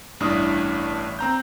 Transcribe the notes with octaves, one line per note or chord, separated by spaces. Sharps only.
A1 G2 D4 E4 D#6
C4 A#5 G6